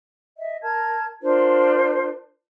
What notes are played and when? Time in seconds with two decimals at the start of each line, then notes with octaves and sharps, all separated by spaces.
0.36 D#5 E5
0.63 A#4 A5 G#6
1.22 D4 F4 A#4 C5